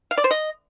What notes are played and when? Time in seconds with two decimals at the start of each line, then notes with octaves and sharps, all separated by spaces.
0.11 F5
0.18 D5
0.24 C5
0.31 D#5